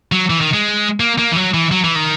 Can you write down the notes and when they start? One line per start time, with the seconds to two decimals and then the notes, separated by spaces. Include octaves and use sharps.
0.12 F#3
0.30 E3
0.41 D#3
0.54 G#3
1.00 A#3
1.18 A#3
1.31 E3
1.36 F#3
1.54 E3
1.71 F#3
1.84 E3
1.96 D#3